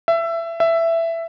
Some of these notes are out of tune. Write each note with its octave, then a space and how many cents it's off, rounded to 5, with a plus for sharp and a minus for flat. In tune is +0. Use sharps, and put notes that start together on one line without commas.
E5 +20
E5 +10